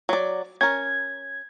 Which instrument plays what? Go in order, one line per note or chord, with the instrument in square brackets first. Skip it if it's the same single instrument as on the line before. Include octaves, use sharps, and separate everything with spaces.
[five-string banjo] F#3 D5
[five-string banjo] C#4 A#4 [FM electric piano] G#6